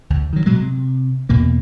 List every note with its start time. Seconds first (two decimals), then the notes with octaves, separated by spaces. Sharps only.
0.10 D2
0.33 D#3 F#3
0.46 B2 F#3 G#3
0.60 C3
1.29 E2 B2 A#3